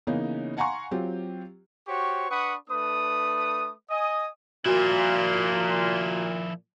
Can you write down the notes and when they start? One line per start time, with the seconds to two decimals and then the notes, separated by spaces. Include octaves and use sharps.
0.07 C#3 E3 A#3 B3 C#4 D#4
0.57 F5 F#5 G#5 A#5 C6 C#6
0.91 F#3 C4 F4 G4
1.88 F#4 G4 C5 C#5 C#6
2.30 D4 B4 F#5 B5 C#6 D#6
2.70 A3 D4 B4 D#6
3.90 D#5 G#5 D#6
4.66 A#2 F3 E4 F#4